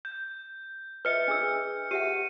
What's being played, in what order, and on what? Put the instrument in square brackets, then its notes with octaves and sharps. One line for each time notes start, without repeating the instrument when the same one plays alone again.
[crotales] G6
[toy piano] B4 D#5 E5 [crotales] F6 C#7
[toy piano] D4 G#4 E6
[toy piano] G4 E5 F#5 [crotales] D#7